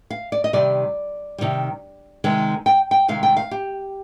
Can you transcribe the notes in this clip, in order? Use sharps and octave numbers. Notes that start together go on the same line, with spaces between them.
F5
D5
D#5
C3 D#3 G3 D5
C3 D#3 G3
C3 D#3 G#3
G5
G5
C3 D#3 G#3 F5
G5
F5
G4